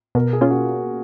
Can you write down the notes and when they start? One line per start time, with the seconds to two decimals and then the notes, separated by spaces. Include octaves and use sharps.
0.15 B2 A#4
0.33 G#4
0.41 A#3 C#4 F4
0.50 F#4